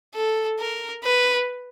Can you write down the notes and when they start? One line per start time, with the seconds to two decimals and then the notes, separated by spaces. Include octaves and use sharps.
0.15 A4
0.59 A#4
1.04 B4